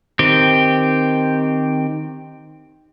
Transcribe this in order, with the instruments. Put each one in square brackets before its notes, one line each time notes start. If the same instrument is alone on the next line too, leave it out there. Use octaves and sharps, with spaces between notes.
[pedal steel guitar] D#3 C4 G4